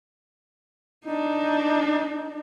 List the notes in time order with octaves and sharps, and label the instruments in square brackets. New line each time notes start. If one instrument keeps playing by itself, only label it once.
[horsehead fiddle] D4 D#4